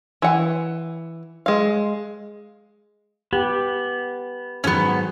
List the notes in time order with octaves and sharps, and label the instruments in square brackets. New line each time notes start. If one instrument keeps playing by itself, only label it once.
[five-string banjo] E3 F#5
G#3 F5
[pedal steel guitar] B3 [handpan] G4
[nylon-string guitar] G#2 D#3 F#3 [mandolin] B3 C#4